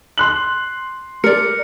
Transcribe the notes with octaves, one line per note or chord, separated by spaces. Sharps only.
C6 F#6 F#7
A#4 D5 C#7